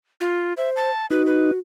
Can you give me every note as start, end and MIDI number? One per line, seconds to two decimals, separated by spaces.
0.21 0.53 65
0.57 0.90 72
0.57 0.70 76
0.76 1.06 81
1.10 1.51 63
1.10 1.59 66
1.10 1.22 71
1.26 1.52 71